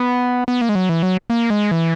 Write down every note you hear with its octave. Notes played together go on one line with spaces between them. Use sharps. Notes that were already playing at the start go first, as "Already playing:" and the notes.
Already playing: B3
B3
A#3
G#3
F#3
E3
F#3
A#3
G#3
E3